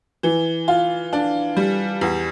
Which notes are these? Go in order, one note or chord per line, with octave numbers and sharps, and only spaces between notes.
E3
F4
D4
G3
E2